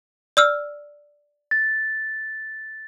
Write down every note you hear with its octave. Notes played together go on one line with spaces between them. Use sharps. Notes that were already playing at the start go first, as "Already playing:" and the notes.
D5 E6 F6
A6